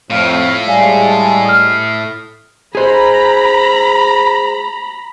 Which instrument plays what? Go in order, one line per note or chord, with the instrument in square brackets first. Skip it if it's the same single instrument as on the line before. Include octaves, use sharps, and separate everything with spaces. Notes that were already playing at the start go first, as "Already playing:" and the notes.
[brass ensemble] F2 [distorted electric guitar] A2 [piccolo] F5
[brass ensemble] G3 G#3 [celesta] D5 F5 G#5 [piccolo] C7
[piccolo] A5
[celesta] D#6 F6 [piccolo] C7
[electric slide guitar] G#4 C5 [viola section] A#5 B5